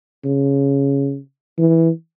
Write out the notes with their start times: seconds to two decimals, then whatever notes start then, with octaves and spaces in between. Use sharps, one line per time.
0.24 C#3
1.58 E3